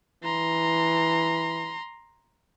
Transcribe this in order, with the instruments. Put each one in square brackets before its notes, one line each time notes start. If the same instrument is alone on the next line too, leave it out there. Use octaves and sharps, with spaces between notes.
[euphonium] E3 [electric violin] A#5 C6